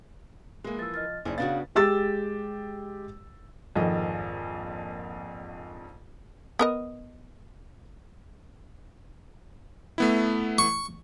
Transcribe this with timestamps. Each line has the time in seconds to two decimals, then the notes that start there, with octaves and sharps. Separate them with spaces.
0.64 E3 G#3 A#3
0.79 F3 E6 A6
0.94 D#5 F6 A6
1.25 F#1 D#4 E4 C5 D5
1.38 C#3 B3 D4 F#4 F5 A6
1.75 G#3 G4 E6 A6
3.76 A#1 F2 G#2 D#3 D#5
6.59 B3 A#4 D#5
9.98 A3 B3 E4
10.58 C#6